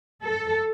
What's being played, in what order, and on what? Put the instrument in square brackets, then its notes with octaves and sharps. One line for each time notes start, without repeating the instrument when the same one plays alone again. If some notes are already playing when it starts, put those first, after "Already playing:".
[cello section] A4